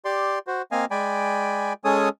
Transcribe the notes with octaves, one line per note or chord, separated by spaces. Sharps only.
G4 D5 C6
F#4 C5
A#3 C4 D#5 F5 G#5
G#3 D5 G5 G#5 B5
G#3 C#4 G#4 A4 C#5 D#6